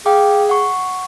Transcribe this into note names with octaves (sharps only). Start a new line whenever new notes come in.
G#4 F5 G5 D6
F#5 C#6